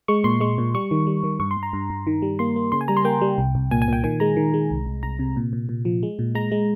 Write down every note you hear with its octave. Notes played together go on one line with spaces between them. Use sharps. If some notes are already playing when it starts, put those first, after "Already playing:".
G#3 C#6
A#2 C6
G#3 C#6
A#2
G3 C#6
D#3
G3
D#3
G2 C#6
C6
G2
A#5
G2
G2
D#3
G3
A#3 C6
A#3
C#3 C6
G#5
G3 A#5
C6
A#3 G5
G3
C2
C2
A#2 G#5
G#5
A#2 G5
D#3 G#5
G#3 A#5
D#3
G#3
C2
C2
C2 A#5
C3
A#2
A#2
A#2
F3
G#3
A#2
G#3 A#5
G#3